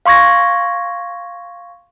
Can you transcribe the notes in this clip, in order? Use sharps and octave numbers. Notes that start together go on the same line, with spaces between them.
F5 C6 C#6 G#6 A#6